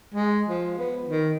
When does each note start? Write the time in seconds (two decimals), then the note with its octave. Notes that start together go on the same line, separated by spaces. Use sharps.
0.14 G#3
0.49 F3
0.78 B3
1.08 D#3